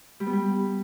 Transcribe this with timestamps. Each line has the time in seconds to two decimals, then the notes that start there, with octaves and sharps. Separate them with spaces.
0.20 G3
0.27 B3
0.33 G3